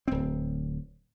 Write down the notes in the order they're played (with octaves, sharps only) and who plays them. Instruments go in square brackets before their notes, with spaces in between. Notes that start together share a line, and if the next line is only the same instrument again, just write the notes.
[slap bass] D1 C4